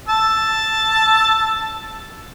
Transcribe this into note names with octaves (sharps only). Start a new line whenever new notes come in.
A5 E6